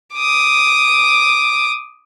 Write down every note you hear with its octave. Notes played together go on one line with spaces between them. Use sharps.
D6 D#6